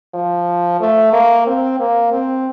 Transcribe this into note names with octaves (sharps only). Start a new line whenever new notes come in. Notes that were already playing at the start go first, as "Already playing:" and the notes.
F3
A3
A#3
C4
A#3
C4